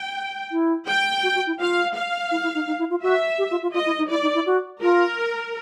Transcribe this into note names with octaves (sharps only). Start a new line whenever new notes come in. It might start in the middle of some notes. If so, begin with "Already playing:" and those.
Already playing: G5
E4
G5
F#4
F#4
E4
F4 F5
F5
E4
E4
D#4
D#4
E4
F4
F#4 E5
G4
F4
F4
F4 D#5
E4
D#4
E4 D5
D#4
E4
F#4
F4 A#4